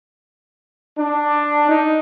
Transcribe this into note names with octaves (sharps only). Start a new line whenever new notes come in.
D4
D#4